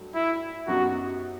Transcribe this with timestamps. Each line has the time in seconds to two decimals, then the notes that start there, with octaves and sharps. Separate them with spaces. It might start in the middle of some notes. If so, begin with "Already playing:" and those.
Already playing: G2 F#3 A3
0.15 E4
0.68 F#2 F#3 B3 D#4 F#4 G4